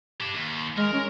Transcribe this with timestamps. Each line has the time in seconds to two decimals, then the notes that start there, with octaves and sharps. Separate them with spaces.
0.21 G4 A5
0.33 D#2
0.77 G#3 A#4
0.93 C#4